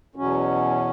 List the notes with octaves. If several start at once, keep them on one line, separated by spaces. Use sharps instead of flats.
E2 B2 F#3 C#4